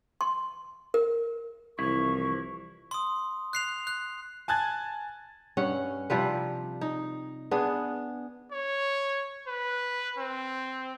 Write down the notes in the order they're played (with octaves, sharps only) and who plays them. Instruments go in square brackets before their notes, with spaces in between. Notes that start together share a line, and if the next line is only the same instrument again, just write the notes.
[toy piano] C6
A#4
[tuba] C2 [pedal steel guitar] E3 F3 E4 [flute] C#6
[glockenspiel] C6 D#6
F#6 C7 F7
F#6
[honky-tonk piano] G#5 A5 F#6 G#6 A6
[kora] G2 C#4 F#5
C3 F3 G3 B4
D#4
B3 D4 G#4
[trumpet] C#5
B4
C4